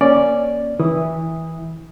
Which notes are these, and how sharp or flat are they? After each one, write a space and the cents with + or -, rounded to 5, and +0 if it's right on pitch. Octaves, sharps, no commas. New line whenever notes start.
A#3 +20 C#4 +0 D5 +0
E3 -20 E4 -10 D#6 +0